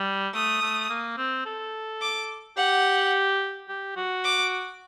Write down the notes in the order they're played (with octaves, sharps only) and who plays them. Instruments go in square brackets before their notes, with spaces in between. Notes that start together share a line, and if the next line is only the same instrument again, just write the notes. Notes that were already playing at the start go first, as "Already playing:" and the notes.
Already playing: [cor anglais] G3
[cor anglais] A3 [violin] D#6
[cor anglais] A3
A#3
C4
A4
[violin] D6
[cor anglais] G4 [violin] F#5
[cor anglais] G4
F#4
[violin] D6